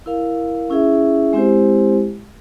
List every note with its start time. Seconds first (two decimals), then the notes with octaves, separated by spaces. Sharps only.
0.06 E4 A#4 F5
0.70 C#4 E4 G#4 E5
1.33 G#3 C4 E4 G4 C5